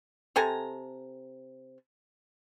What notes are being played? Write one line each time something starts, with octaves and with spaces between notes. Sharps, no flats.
C3 A4 G#5 A#5